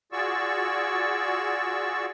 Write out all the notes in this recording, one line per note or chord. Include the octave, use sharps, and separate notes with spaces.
F4 F#4 G#4 D5 C#6 E6